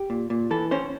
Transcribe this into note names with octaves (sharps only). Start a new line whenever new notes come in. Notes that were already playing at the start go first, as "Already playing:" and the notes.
Already playing: G4
A#2
A#2
E3 A4
C#4 C5